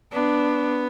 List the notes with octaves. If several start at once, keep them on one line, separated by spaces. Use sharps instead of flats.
B3 D4